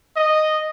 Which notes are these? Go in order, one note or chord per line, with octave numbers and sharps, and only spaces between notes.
D#5